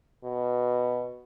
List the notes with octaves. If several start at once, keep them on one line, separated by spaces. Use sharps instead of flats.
B2